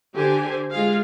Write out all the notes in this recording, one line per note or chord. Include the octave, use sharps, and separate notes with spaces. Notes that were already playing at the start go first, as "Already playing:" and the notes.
D3 G4 C5 G#5
G#3 F4 G#4 F5